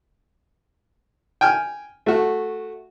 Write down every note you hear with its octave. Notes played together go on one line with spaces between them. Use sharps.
G5 G#5 F6
A3 F#4